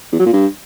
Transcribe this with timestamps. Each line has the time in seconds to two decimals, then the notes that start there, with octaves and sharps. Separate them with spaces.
0.12 E2
0.19 F#3
0.26 A#2
0.33 G2